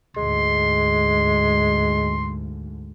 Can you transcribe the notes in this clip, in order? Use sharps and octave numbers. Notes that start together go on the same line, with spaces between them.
D2 G#2 G#3 C6